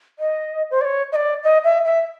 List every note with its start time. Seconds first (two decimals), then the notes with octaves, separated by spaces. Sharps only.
0.19 D#5
0.71 C5
0.81 D5
0.85 C#5
1.12 D#5
1.16 D5
1.43 D#5
1.64 E5
1.85 E5